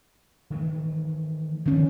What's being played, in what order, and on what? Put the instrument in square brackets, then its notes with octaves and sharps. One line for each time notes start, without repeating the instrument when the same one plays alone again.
[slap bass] D#3 E3 A3
[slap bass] D3 F3 [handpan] D#3 C#4